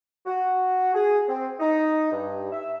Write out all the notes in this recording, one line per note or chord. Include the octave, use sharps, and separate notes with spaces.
F#4
G#4
C4
D#4
G2
E5